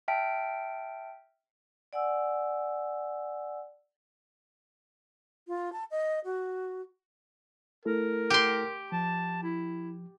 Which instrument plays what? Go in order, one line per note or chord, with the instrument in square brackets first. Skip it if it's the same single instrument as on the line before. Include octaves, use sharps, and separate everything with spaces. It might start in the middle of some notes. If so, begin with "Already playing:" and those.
[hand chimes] E5 G5 A5 F6 B6 D7
[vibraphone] D5 F#5 G#5 E6
[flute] F4
A5
D#5
F#4
[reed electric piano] A3 E4 A4 [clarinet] A#4
[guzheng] G4 C6
[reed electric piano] F3 [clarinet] A5
[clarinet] E4